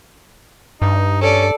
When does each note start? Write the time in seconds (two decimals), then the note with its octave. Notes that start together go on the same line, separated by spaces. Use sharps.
0.82 G2 D#4
1.21 C#4 A4 D5